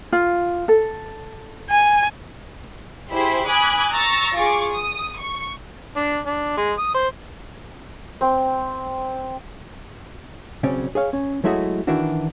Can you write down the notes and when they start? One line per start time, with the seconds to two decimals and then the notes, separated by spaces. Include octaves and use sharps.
0.13 F4
0.68 A4
1.70 G#5
3.11 E4 G4 G#4 C5 B5 C6
3.46 G#5 B5 D6 D#6 F#6 G#6
3.92 A#5 C#6 E6 A6 A#6
4.35 F4 G#4 C#6 D6
4.71 D#6
5.18 C#6
5.97 D4
6.26 D4
6.57 G#3
6.79 D#6
6.94 C5
8.21 C4
10.63 B1 C#3 C4 C#4 D5
10.95 G#4 C#5 F5
11.13 C#4
11.44 F#3 G#3 A3 E4 F#4 D#5
11.87 D#3 E3 D4 E4 F#4